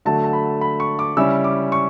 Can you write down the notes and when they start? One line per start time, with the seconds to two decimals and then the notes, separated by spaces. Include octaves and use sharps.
0.05 D3 F#3 A3 A5
0.24 A5
0.33 B5
0.61 B5
0.80 C#6
0.99 D6
1.17 C#3 G3 C#4 E4 E6
1.44 D6
1.72 C#6